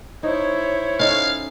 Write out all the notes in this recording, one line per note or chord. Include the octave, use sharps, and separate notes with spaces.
D#4 E4 C5 C#5
C#4 D#4 A4 F5